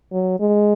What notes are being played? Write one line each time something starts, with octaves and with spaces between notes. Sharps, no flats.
F#3
G#3